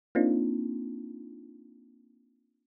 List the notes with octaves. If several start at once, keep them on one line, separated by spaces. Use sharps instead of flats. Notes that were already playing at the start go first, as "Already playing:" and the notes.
A#3 C4 D4 D#4 F4